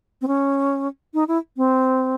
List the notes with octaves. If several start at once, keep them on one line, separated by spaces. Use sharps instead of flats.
C4
C#4
D#4
E4
C4